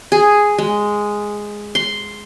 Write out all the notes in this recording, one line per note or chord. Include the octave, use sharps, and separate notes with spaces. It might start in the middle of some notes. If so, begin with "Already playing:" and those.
G#4
G#3
C6